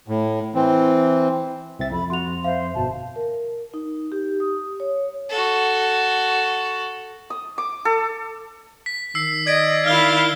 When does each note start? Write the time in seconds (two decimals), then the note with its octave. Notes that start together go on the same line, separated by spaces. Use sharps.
0.08 A2
0.55 E3 C4
1.79 C2 C4 E5 A6
1.92 F2 B5
2.10 F#4 C6 F7
2.44 C5 E5 F5
2.74 G1 B2 A5
3.16 A#4
3.74 D#4
4.12 G4
4.40 D#6
4.80 C#5
5.29 F#4 A4
7.30 D#6
7.58 D6
7.85 A4
8.86 B6
9.15 D#3 E6 C7
9.47 D5 D#5 G#6 B6 D7
9.86 D#3 E4 F5 F6 G7